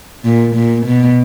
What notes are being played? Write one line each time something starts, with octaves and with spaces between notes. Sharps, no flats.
A#2
A#2
B2